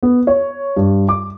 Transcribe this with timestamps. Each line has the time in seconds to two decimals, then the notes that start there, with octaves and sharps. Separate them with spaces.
0.03 B3
0.27 C#5
0.76 G2
1.09 D6